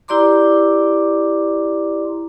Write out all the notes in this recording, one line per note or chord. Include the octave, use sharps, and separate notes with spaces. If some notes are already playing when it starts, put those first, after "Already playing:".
E4 G4 D5 A#5 C6 D6